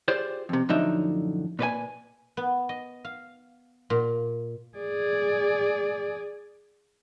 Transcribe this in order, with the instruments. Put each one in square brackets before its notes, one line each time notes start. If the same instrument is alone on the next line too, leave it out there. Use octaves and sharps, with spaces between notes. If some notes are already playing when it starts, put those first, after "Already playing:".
[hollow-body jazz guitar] F4 G4 G#4 C5 D5
F2 C3
F#2 A2 D3 F3 D#4 E5
A#2 B4 D5 G#5
[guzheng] B3
D#5
F5
A#2
[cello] G#4 D5